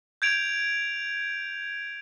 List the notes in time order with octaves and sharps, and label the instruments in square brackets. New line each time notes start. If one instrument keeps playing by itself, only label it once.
[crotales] G6 G#6 D7 F7